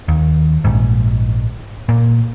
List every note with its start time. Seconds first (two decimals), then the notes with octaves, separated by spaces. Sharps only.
0.08 D#2
0.64 A#1 G#2
1.89 A#2